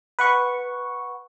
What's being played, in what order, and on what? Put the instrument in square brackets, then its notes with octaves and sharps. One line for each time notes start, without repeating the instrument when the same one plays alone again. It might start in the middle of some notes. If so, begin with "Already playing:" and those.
[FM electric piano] B4 F#5 C#6